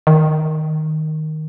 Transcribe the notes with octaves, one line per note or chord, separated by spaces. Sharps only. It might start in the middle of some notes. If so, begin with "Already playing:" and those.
D#3